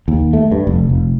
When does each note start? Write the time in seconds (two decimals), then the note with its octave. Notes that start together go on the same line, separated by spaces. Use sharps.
0.08 D#2
0.33 A3
0.52 G2
0.67 F1
0.89 F1